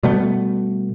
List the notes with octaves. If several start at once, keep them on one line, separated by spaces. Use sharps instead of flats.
B2 G3 A3 B3